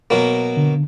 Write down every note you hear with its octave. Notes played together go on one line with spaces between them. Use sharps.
B2 F#3 A#3
D3